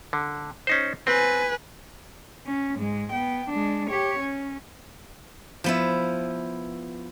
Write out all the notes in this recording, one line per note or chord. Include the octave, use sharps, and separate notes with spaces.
D3
C#4 D#4 C5
C4 B4 G#5
C#4
G#2 G#3
B3 G5
G#3 D4
G4 C#5
C#4
F3 B3 E4